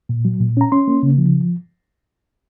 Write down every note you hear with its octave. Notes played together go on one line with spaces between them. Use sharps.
A#2
F#3
A#2
C#4 A#5
C#4 C6
A#3
C#3
F3